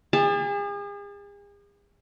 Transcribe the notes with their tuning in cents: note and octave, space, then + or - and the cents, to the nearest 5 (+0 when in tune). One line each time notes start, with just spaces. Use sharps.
G#4 -40 A5 +0